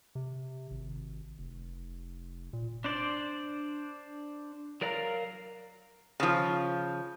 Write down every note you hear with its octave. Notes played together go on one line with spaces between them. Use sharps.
C3
G#1
F1
A#2
D4 C5 D5
F#3 A#4 D5 F5 A#5
C#3 F3